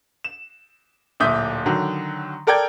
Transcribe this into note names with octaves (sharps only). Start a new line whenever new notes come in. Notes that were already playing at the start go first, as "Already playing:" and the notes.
E7
D1 A#2 E5 D#6 G6
D3 D#3 F#3
A4 A#4 D5 G5 G6 G#6